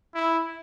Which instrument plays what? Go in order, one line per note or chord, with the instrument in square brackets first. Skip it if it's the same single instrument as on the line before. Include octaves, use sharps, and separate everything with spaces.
[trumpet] E4